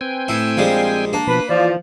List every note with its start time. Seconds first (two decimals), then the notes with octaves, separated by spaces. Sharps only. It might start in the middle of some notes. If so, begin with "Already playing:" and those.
0.01 C4 B4 G5 G#5
0.28 A2 E4
0.57 A#1 G3 G#3 F5
1.13 A#3 D4
1.27 B2 F3 B4
1.49 E3 F3 D5